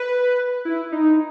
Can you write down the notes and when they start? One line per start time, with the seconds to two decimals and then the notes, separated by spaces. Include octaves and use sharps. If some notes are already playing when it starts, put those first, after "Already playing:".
Already playing: B4
0.65 E4
0.92 D#4